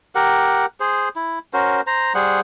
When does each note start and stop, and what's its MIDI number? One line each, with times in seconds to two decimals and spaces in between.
0.15 0.66 67
0.15 0.66 70
0.15 0.66 78
0.80 1.09 68
0.80 1.09 72
1.16 1.39 64
1.53 1.81 61
1.53 1.81 66
1.53 1.81 70
1.53 1.81 72
1.87 2.13 72
1.87 2.13 82
2.15 2.41 55
2.15 2.41 68
2.15 2.41 72
2.15 2.41 78